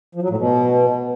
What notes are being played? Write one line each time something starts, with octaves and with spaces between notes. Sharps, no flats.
F3
F#3
A2
B2